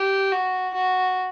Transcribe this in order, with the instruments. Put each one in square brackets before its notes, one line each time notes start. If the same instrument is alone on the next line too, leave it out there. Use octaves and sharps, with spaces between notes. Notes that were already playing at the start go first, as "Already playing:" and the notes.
Already playing: [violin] G4
F#4
F#4